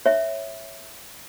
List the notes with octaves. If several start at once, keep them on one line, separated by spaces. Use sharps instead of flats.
C#5 E5